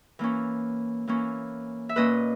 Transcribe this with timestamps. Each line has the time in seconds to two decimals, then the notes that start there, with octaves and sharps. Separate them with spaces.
0.19 E3 A#3 C#4
1.07 E3 A#3 C#4
1.89 E5
1.96 A#2 A#3 C#4 B4 D#5